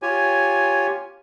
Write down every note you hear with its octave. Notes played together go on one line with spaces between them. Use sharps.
F4 G4 C#5 G#5